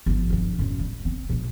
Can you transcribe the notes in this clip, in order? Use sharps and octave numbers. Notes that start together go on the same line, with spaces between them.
G1 F2
G2 F3
F#2 A2
G3
C4
A#1 G#3